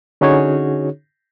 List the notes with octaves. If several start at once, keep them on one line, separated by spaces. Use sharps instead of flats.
D3 C#4 D#4 F#4 G#4 C#5